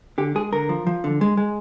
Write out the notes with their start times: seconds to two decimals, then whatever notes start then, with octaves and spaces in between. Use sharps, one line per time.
0.18 D3 G4
0.35 G#3 G#4
0.53 D3 A#4
0.69 F3
0.87 F3
1.04 D3
1.21 G#3
1.37 G#3